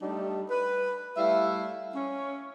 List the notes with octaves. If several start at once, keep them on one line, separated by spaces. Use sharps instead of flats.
G3 A3 D4 D#4
B4
G3 A3 E4 E5 F5
C#4